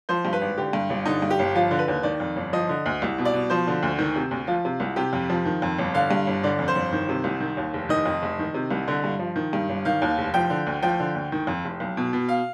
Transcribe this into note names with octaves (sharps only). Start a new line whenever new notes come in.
F3 C5
G2
B4
G#1
D3 G4
G2
G1
D3 D#4
G2
G4
G1
F3 F4
D3
B4
D#2
D#3 D5
F2
G1
F3 D#5
D3
D2
C2
B2
D5
B2
F3 C5
D3
D2
D#3
C3
D2
F3 F4
C3
C2
C3 G4
F2
F3
D#3
F2
G1
D3 F5
G2
G1
D3 D5
F2
C5
G1
D#3
C3
C2
D#3
D#2
F1
D#3 D#5
F2
F1
D#3
C3
C2
D3
G2
F3
D#3
G2
G1
D#3 F5
D#2
F1
F3 G5
D3
D2
F3 G5
D3
D2
D#3
F2
F1
B1
B2
B2
F5